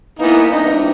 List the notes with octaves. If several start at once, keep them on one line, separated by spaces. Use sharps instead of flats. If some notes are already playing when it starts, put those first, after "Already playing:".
E3 A#3 B3 D#4
G2 C3 D4 D#4